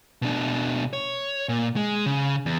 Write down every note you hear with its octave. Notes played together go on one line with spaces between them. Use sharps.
B2 D4
C#5
A#2
G#3
C#3
E2